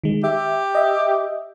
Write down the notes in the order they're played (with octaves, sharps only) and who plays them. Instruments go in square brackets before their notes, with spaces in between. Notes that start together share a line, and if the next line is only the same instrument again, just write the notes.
[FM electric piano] D#3 G#3
[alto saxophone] G4 [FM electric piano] E5
[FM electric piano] D#5 E5